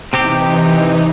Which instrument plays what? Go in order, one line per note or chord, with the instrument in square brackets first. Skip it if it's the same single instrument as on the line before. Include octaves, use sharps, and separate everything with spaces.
[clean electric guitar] C3 C4 G4 [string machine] E3 D#4